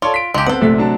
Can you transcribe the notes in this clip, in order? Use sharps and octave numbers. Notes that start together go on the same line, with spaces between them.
F4 A4 C#5 D5
B6 D7
C#2 G#3 G4
B3 C4 A4 C5 F#5
A#1 C3 A3 B6
F#3 D4 A5